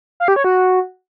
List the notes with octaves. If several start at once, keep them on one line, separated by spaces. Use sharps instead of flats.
F5
G4
C#5
F#4